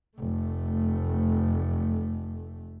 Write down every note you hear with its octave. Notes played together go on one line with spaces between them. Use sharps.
F1 A3